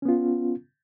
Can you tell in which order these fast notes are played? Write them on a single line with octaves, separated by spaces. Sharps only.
C#4 B3 F4